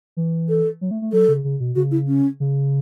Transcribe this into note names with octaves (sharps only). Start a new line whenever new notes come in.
E3
A4
F#3
A3
A3
F#3 A4
C#3
C#3
B2
C#3 F#4
E4
C#4
C#3